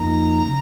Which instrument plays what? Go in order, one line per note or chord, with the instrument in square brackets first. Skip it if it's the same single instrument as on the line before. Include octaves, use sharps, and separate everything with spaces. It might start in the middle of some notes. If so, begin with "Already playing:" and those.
Already playing: [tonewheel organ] F2 F3 A#3 D#4 [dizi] A#5
[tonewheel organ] C#3